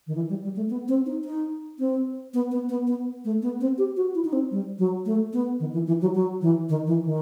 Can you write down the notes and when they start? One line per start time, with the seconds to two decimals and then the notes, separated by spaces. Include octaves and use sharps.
0.07 D#3
0.15 E3
0.29 G3
0.43 G3
0.56 A3
0.70 B3
0.88 C4
1.06 D#4
1.24 D#4
1.79 C4
2.34 B3
2.51 B3
2.69 B3
2.87 B3
3.25 A3
3.42 B3
3.61 C4
3.78 G4
3.97 F#4
4.15 E4
4.25 D#4
4.33 C4
4.51 G3
4.78 F#3
5.06 A3
5.33 B3
5.60 D#3
5.73 E3
5.87 E3
6.01 F#3
6.15 F#3
6.42 E3
6.69 D#3
6.87 E3
7.05 D#3